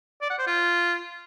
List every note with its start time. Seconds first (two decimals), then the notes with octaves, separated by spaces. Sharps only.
0.21 D5
0.30 F#5
0.39 C5
0.47 F4